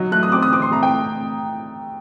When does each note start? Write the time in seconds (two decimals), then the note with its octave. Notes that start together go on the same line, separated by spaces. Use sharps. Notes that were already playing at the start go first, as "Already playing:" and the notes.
Already playing: F#3 D#4
0.12 A3 F#6
0.23 D#6
0.32 C4 D6
0.42 D#6
0.52 C4 D6
0.62 C6
0.71 A3 A#5
0.83 G5